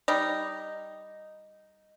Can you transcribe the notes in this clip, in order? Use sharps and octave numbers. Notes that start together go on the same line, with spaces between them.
G3 D#4